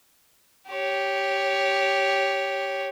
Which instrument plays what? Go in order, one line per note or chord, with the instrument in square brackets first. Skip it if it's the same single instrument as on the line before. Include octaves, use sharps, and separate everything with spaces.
[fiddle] G4 C#5